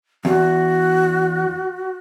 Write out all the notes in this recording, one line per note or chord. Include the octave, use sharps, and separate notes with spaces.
E2 F#4